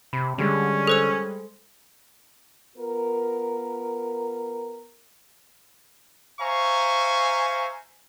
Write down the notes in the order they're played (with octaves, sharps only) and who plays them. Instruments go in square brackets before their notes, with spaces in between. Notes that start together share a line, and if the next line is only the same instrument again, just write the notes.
[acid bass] C3 [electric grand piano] B5
[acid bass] D3 [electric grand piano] G3 G#3 [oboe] C#4
[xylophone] A4 C5 E6
[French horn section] B3 F4 A#4
[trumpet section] C5 E5 F5 G#5 A#5 C#6